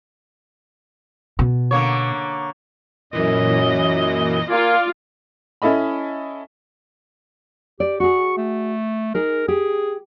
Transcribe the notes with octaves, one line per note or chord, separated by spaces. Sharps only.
B2
D3 A#3 C#5
F#2 A#2 E3 D#5
A#3 F4 D5 G#5
C#4 E4 A4 D#5 B5
G4 D5
F#4 G#4 C#6
A3
D#4 G#4 A#4
G4 G#4